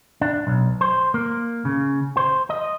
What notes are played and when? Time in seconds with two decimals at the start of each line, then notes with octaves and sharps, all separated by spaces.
0.21 D4
0.47 B1
0.81 C5
1.14 A#3
1.65 C#3
2.17 C5
2.50 D#5